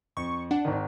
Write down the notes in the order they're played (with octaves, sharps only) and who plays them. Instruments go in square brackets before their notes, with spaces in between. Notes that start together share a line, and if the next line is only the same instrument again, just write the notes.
[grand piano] F2 [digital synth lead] C#6
[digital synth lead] D4 [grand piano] F#5
[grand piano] G#1 D#3